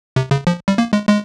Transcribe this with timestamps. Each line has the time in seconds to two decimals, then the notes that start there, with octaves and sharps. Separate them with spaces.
0.16 C3
0.31 C#3
0.47 F3
0.68 G3
0.78 A#3
0.93 G#3
1.09 G#3